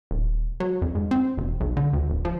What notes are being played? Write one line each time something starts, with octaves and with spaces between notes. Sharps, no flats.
D#1
F#3
F2
G#2
C4
E1
B1
D3
D2
D1
F3